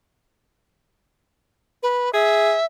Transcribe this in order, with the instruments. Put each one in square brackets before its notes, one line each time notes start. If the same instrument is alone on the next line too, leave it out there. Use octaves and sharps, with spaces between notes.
[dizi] B4
[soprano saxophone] G#4 [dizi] E5